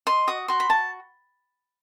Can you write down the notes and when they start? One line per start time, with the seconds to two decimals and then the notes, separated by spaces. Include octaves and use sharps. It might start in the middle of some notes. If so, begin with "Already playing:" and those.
0.07 D#5 C6
0.27 F#4 D#6
0.48 F#4 C6
0.60 B5
0.69 F#4 A5